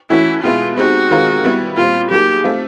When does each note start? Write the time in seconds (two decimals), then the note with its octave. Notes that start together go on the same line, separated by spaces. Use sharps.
0.10 E3 A3 C#4 E4 F#4
0.43 B2 G#3 B3 E4 F4
0.77 G#3 C4 D#4 F#4 G4
1.11 D#3 G#3 C4 F4 A#4
1.44 G3 B3 E4
1.77 A#2 G3 C4 F4
2.11 F#3 A#3 D#4 G4 G#4
2.44 A3 C4 F4